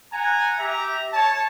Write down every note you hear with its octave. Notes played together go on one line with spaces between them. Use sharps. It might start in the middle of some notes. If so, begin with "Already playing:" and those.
F#5 G#5 A#5
G4 E5 A#5
C#5 A5